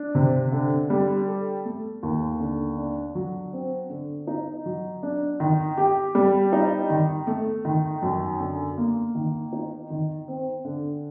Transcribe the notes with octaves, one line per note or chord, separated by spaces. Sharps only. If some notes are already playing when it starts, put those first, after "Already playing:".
Already playing: D4
C3
D3
G3
A4
A3
D#2
D3
D4
F#3
C4
D3
D#4
F#3
D4
D#3
G4
G3
D#4
D#3
A3
D#3
F#2
D3
A#3
D#3
D#4
D#3
C4
D3